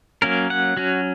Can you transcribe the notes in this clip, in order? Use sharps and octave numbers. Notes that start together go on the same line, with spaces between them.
F#3 A#3 C#4 A#4
F#5
F#3 C#4 F#4